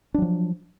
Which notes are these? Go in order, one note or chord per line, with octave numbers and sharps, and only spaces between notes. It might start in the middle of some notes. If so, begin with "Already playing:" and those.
F3 F#3 D4